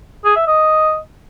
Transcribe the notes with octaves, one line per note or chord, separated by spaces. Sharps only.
G#4
E5
D#5